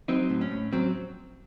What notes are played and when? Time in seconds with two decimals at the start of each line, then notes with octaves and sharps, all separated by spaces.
0.08 F#3 C4 D#4
0.30 A2
0.41 C#4
0.51 A2
0.73 F#3 C4